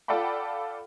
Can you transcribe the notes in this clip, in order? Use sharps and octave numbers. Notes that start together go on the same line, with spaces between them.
F4 A4 D5 F#5 G5 B5